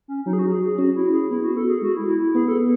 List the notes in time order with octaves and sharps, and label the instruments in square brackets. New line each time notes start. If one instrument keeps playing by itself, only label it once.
[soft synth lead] C#4
[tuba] F#3 [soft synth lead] D#4
[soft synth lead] G#4
F#4
G#4
G#4
[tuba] C#4 [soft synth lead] F#4
[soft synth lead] E4
G#4
[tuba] B3 [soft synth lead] E4
[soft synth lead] F#4
A4
G#4
[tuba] G#3 [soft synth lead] F#4
[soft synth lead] E4
E4
E4
[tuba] B3 [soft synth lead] G#4
[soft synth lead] A4